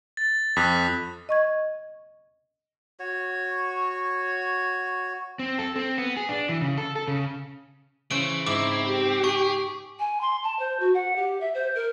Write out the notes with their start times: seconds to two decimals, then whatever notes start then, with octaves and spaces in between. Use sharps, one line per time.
0.17 A6
0.56 F2 D#6 F#6 B6
1.29 D#5 C#6 G#6
3.00 F#4 C#5
5.39 C4
5.59 A4
5.76 C4
5.98 B3
6.17 G#4
6.29 D4
6.49 E3
6.61 C#3
6.78 A4
6.96 A4
7.08 C#3
8.11 C#3 E3 C5 C#6 D7
8.46 G#2 C4 E4 D6
8.85 G4
9.24 G#4 C#6
9.99 G#5
10.21 C6
10.43 A5
10.59 C5
10.79 F#4
10.94 F#5
11.16 G4
11.40 E5
11.54 C5
11.75 A#4